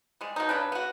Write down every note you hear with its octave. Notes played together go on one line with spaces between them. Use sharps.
G3 G#3
B2 D#4
C#3 D4 B4
B3 F#4